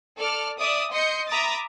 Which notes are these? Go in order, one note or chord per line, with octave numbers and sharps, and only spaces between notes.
A4 D5 F6
D5 E5 D#6
D#5 C6 G6 C#7
E5 A#5 B5 D6 D#6 A6